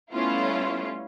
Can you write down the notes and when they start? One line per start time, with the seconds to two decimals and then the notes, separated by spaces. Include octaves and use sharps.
0.12 G3 A3 B3 C#4 E4 F4